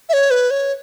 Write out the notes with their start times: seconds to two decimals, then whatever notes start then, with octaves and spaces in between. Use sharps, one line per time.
0.09 E5
0.13 C#5
0.31 B4
0.51 C#5